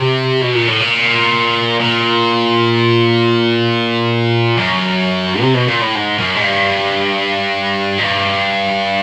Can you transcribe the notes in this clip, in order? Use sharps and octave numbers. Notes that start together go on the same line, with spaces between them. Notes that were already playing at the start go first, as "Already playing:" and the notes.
Already playing: C3
B2
A#2
A2
A#2
A#2
F#2
C3
B2
A#2
A2
G#2
F#2
G#2
G2
G#2
G2